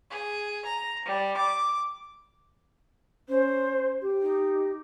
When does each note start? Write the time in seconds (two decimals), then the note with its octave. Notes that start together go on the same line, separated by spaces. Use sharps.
0.10 G#4
0.66 A#5
1.06 G3
1.37 D6
3.29 C#4 C5
4.02 G4
4.22 D#4